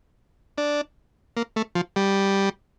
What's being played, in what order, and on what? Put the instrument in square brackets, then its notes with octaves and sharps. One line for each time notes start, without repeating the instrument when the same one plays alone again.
[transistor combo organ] D4
A#3
A3
F3
G3